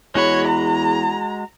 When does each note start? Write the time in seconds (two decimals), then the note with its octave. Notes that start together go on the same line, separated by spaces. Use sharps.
0.15 E2 G#3 F#4 C#5 B5
0.47 A#5